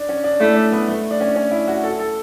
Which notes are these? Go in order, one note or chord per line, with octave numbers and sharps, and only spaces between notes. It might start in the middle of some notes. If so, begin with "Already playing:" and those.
Already playing: D4
C#4
D4
A3 E4
D4
B3
A3
D4
C#4
C#4
E4
F#4
A4
A4